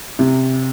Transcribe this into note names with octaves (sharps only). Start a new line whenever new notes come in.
C3